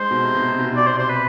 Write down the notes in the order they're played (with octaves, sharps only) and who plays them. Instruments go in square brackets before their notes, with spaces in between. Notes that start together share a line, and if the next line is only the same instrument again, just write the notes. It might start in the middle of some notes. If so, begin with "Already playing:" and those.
Already playing: [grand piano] G#3 [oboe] C5
[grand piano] B2
C3
B2
C3
B2
B2
[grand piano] C3 [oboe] D5
[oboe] C5
C5
B4